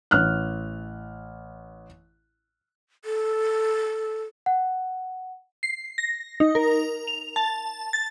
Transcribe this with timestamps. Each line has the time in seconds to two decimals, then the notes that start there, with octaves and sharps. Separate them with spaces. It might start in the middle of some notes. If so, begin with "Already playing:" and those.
0.11 A1 F6 F#6
3.05 A4
4.46 F#5
5.63 C7
5.98 A#6
6.40 D#4
6.55 A#4
7.07 F7
7.36 A5
7.93 A6